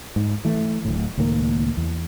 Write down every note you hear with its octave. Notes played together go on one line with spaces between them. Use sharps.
G#2
E3 A3
D1 A2
C#2 A2 D#3 A#3
E2